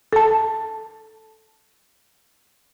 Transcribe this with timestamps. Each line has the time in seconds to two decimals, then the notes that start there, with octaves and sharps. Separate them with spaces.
0.13 A4 A5